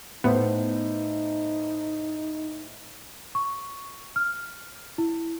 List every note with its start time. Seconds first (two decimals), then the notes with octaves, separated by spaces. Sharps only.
0.24 A2 B3 D#4 C5
3.35 C#6
4.16 F6
4.98 E4